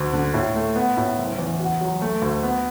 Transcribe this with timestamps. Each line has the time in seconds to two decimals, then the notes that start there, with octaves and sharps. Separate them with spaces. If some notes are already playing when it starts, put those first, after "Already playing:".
Already playing: D2
0.13 D3
0.34 A2
0.56 A3
0.76 B3
0.97 A2
1.18 F#1
1.39 E2
1.59 F#4
1.81 F#3
2.02 A3
2.22 D2
2.43 B3